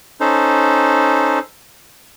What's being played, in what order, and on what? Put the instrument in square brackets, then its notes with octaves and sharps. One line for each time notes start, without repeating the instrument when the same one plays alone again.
[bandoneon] C#4 D#4 A4 C5